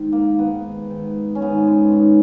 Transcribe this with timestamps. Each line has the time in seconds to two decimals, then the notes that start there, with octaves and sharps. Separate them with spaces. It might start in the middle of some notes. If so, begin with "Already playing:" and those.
Already playing: G#2 D#3
0.12 A#3
0.39 G#2 D#3 B3
0.90 G#2 D#3
1.35 C#4
1.42 G#2 D#3 B3
1.67 G#3
1.92 G#2 D#3